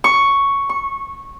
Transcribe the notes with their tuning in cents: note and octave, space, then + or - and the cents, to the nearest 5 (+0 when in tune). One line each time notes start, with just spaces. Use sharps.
C#6 +5
C#6 -15